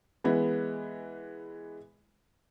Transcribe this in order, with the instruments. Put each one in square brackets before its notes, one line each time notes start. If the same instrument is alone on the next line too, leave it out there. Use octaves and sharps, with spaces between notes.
[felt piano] E3 G#3 B3